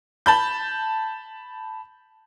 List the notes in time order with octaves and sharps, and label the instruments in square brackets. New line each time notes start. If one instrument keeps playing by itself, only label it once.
[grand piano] A5 B5 G6